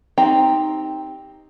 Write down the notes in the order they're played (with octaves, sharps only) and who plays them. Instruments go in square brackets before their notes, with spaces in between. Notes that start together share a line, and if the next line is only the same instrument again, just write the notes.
[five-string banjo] C4 D#4 G4 G5 A#5